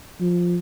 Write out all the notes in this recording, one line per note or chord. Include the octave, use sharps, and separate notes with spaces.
F3